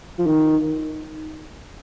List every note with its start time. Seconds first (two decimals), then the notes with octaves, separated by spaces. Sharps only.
0.18 F3
0.26 D#3